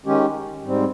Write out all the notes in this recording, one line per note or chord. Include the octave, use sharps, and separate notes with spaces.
D#3 G#3 C#4 G4
G#2 G3 C4